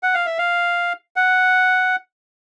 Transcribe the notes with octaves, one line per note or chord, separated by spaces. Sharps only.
F#5
F5
E5
F5
F#5